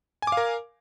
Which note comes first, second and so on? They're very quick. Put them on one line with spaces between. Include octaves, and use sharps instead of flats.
G#5 D6 F5 A#4